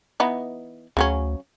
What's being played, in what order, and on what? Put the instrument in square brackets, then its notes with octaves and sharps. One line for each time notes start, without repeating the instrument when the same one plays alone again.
[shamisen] E3 B3 D#4
[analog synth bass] D2 [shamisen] C#3 F#3 C#4